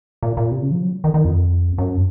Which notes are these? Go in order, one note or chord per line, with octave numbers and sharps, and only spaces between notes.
A#2
A#2
C3
C#3
F3
F#3
D#3
D#3
F2
F#2